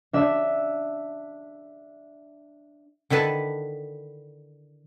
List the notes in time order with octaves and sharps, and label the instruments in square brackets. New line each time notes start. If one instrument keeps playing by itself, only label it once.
[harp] D4 E5
[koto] D3 D#3 E4 B4 A5